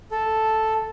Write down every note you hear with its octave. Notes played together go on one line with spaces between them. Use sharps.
A4